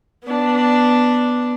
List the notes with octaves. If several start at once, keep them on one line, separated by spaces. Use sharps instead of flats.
B3 D4